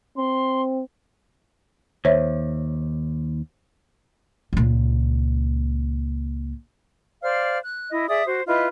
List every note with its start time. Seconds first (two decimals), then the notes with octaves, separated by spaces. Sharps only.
0.17 C4 C6
2.05 D#2 C5 C#5 E5
4.53 C#2 A#2
7.22 C5 D5 F5 F6
7.63 F#6
7.90 E4 D#5
8.08 G#4 D5 E5 D#6
8.26 F#4 C5
8.46 E4 F4 B4 D#5